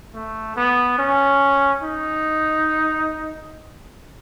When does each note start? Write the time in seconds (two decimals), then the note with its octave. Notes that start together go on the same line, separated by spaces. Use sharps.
0.14 A3
0.56 B3
0.98 C#4
1.82 D#4